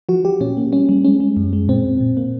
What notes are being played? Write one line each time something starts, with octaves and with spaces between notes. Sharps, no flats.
F3 F#4
F3 G4
A#2 C#4
A#3
G3 C#4
G3
G#3 C#4
G#3
F#2
G#3
A#2 C4
A#2
A#2
A#3